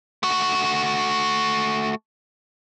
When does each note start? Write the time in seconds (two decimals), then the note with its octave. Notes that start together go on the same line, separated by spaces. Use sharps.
0.23 A3 F#4